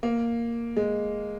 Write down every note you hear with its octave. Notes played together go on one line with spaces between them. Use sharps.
A#3
G#3